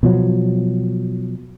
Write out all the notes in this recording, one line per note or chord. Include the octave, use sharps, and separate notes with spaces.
B2 F3 F#3